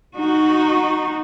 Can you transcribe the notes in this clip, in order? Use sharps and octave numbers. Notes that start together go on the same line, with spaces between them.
D#4 F#4